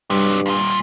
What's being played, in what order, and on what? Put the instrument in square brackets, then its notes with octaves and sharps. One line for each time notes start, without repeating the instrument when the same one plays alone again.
[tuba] G2 [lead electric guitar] C3 F#3 [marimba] G3
[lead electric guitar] D#2 A#2